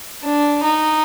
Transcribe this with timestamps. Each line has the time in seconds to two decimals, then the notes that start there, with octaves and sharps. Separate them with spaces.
0.23 D4
0.64 D#4